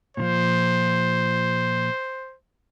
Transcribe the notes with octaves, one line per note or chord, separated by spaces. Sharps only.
A#2 D#3 F3 C5